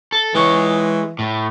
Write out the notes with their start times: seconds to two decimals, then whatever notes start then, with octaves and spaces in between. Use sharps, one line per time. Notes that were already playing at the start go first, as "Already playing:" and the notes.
0.12 A4
0.35 E3 G#3 C#5
1.19 A2